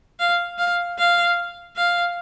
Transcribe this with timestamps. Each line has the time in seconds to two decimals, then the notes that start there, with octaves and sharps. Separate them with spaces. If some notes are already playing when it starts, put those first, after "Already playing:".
0.19 F5
0.58 F5
0.98 F5
1.76 F5